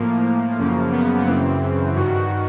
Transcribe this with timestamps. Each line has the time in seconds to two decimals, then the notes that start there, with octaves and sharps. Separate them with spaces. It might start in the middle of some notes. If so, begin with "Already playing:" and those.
Already playing: A2 F3 A#3
0.59 F#2 C#3 F3
0.92 B3
1.27 F#2 C#3 E3 C4
1.95 G2 D#3 F#4